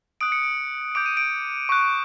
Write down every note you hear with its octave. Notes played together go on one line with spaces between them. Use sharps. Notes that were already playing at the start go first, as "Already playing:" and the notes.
D#6 F#6 D7
C#7
D7
D6 G6 D7
D#7
D7
C#6 F#6